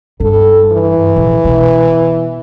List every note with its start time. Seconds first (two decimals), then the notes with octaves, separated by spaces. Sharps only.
0.20 G2 A4
0.72 E3
1.16 A#1 F3
1.45 B2